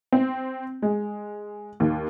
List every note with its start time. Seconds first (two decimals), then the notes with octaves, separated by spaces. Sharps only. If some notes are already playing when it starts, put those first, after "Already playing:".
0.12 C4
0.82 G#3
1.80 D#2